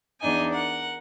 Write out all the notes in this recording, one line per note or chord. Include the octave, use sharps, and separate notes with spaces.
E2 D4 D#4 D#5 G#5
A#4 F#5